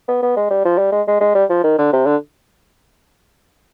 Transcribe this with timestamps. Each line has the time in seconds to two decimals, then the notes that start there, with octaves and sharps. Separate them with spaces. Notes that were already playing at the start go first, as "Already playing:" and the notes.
0.08 B3
0.22 B3
0.37 G#3
0.50 G3
0.65 F3
0.78 G3
0.92 G#3
1.08 G#3
1.21 G#3
1.35 G3
1.50 F3
1.64 D#3
1.78 D3
1.93 C3
2.06 D3